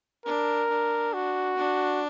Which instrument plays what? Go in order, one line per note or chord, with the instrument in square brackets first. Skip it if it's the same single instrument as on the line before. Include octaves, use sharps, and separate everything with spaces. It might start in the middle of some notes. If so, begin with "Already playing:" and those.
[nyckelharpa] D4 [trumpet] A#4
[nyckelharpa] D4
[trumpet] F#4
[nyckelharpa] D4